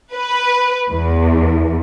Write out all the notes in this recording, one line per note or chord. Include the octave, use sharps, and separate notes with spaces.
B4
E2